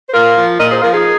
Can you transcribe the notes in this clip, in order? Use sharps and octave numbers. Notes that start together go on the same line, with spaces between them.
C5
A#2 F4 A#4
F3
A#2 A#4 D#5
G#4 C5
F3 F4 A#4
D#4 G#4